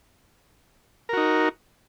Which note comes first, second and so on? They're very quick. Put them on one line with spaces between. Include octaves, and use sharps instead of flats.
A#4 F#4 D#4